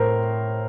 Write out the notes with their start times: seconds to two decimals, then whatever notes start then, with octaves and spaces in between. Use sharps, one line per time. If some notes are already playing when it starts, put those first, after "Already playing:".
Already playing: A2 A#4 C5